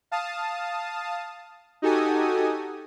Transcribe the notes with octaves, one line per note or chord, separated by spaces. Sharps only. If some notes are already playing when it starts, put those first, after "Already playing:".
F5 A5 D#6
D#4 F#4 G4 A4 G#5 D#6